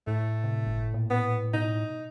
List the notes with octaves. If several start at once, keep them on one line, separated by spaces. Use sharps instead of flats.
A2 A3
C3
G1
A#2
B3
B2 D#4